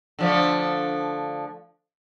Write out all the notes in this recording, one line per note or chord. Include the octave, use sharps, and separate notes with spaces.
D3 F3 A3